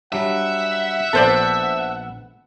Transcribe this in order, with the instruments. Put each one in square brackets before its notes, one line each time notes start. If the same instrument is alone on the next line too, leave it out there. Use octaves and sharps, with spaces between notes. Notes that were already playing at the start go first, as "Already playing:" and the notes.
[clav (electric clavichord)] F#3 G3 D4 [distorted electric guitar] E5 [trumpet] F#5
[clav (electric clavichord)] A#1 B3 A5 [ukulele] A4 C5 D5